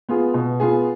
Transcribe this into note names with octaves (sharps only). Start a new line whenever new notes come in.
B3 F4 G#4
B2
B3 F4 G#4